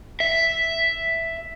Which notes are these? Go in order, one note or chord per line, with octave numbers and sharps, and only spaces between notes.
E5